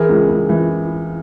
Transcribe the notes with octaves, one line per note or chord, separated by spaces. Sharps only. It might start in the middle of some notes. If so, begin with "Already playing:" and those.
Already playing: E3 G#4 A#4
C#2
C#2
E3